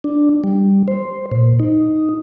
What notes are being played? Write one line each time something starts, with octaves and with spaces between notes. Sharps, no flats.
D4
G3
C5
A#2
D#4